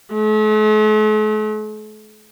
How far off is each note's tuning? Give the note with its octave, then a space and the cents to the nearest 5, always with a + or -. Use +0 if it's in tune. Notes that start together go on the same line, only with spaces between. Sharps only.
A3 -45